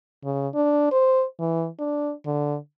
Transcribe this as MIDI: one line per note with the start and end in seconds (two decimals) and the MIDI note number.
0.24 0.48 49
0.55 0.88 62
0.92 1.25 72
1.40 1.68 52
1.79 2.12 62
2.26 2.57 50